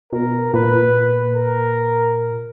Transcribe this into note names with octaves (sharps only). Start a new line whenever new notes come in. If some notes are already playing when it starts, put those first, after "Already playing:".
B2 A#4
A#2 B4
A#4